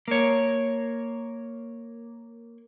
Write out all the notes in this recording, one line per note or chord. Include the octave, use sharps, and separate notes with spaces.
A#3 C#5